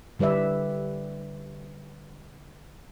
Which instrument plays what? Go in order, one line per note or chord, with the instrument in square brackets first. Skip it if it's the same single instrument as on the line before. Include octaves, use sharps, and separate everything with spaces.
[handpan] D3 G3 B4 D5 E5